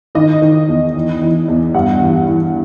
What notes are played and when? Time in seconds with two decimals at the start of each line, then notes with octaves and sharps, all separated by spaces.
0.15 D#3 D#5
0.42 D#3
0.68 E2
0.95 E3
1.21 E3
1.48 E2
1.74 G2 F#5
2.01 E3
2.28 E3